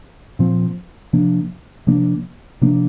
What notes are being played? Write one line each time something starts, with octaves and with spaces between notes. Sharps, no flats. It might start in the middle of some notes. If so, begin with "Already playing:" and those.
A#2 F3 C4
C3 F3 A#3 D4
C3 F3 A#3 D4
C3 F3 A#3 D4